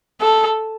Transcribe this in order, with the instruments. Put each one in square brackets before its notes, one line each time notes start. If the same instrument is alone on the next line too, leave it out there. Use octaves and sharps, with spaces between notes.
[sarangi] A4